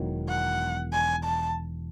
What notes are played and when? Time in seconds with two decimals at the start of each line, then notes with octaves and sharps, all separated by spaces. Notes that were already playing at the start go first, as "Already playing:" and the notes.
Already playing: E1 E2 D#3 F#3
0.29 F#5
0.93 G#5
1.24 A5